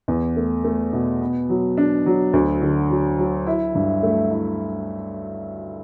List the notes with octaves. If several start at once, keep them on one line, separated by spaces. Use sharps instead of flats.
E2
A3
A3
B2
B3
F#3
D4
F#3
D2
D3
F#3
F#3
E4
G2
A3
E4